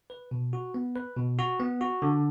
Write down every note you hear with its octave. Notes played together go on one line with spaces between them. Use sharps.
B4
B2
F#4
B3
B4
B2
F#4
B3
F#4
D3